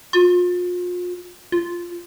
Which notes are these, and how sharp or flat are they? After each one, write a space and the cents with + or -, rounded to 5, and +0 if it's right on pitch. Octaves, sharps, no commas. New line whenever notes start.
F4 +35
F4 -5